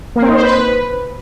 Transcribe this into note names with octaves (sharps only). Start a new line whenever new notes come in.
A#3
C4
D#4
C5
B4